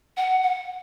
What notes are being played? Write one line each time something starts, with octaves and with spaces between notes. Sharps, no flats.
F#5
F#5